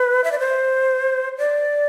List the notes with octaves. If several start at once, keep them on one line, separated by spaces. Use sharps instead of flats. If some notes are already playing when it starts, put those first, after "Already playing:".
Already playing: B4
E5
D5
C5
D5